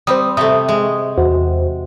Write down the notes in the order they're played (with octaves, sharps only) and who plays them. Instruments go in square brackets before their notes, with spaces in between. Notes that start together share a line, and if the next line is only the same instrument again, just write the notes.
[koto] G3 C4 [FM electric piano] C5 D#6
[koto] C3 A3 [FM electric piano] D#6
[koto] G#3
[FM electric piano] E2 F#4 C5